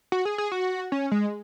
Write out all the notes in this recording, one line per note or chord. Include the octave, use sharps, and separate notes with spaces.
F#4
G#4
G#4
F#4
C#4
G#3